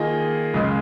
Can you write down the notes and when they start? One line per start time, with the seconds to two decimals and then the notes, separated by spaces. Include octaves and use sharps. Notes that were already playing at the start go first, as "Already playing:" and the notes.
Already playing: D#3 A#3 F4 G#4 D#5
0.54 C#2 C#3 G#3